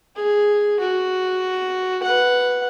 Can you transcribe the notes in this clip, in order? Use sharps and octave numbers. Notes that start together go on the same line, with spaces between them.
G#4
F#4
B4 F#5